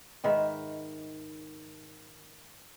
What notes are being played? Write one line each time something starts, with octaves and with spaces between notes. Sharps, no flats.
G#2 D#3 B4 E5